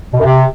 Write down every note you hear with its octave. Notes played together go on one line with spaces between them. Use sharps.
B2
F#2
C3